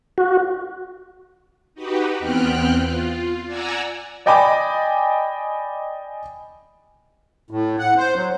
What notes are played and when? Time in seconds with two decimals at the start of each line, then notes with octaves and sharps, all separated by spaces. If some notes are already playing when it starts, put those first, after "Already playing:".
0.18 F#4
1.74 D#4 F#4 G4 B4
2.19 E2 B3 C4 G5 F6 F#6
2.80 F4
3.46 D5 F#5 G#5 A#5 E6
4.26 D5 D#5 G5 G#5 B5 D6
7.51 A2
7.79 F#5
7.97 C5
8.16 F#3